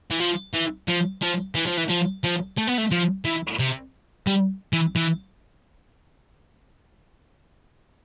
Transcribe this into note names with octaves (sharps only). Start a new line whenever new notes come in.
E3
F3
E3
F3
F3
E3
F3
E3
F3
F3
A3
B3
A3
F3
E3
C3
G3
E3
E3